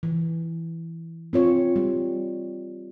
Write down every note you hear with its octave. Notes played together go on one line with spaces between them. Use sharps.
E3
C4 F4 C#5
G3